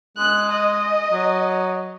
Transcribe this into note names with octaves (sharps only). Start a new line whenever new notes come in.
G#3 F#6
D#5
F#3